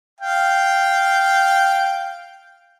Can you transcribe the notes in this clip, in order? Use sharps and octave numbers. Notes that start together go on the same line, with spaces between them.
F5 G5